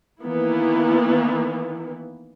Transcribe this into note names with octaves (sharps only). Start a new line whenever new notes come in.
D#3 E3 A#3 B3 E4